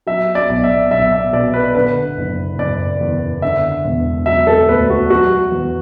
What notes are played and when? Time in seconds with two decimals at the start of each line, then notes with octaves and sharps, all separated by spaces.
0.07 F#3 E5
0.35 D5
0.49 B1
0.64 E5
0.91 B1 E5
1.12 E5
1.33 B2 D5
1.54 B4
1.75 D3 B4
2.17 F#1
2.58 F#1 D5
3.01 E2
3.42 D3 E5
3.84 E1
4.26 F#3 E5
4.47 A4
4.69 D2 B4
4.90 F#4
5.10 F#3 F#4
5.52 E2